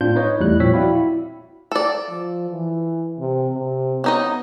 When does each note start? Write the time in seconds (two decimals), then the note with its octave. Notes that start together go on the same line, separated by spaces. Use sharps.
0.01 A2 C4 D4 F4 G6
0.15 D#4 B4 C#5 D#5
0.40 E2 G3 A3 E4 F#6
0.60 A#2 F3 C4 C#5 E6 B6
0.74 E4 F#4 D5 F5 G5 B5
0.96 E4
1.72 A4 D5
2.10 F3
2.50 E3
3.19 C3
3.53 C3
4.04 B3 C#4 D#4 D#5